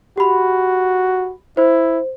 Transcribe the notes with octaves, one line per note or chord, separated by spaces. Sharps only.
F#4 G4 B5
E4 C5